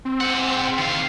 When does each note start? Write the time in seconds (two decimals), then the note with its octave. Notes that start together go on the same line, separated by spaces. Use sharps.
0.05 C4
0.21 G#3 F#5
0.78 D#3 F5